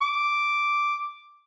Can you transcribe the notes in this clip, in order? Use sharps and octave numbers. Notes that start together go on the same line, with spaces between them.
D6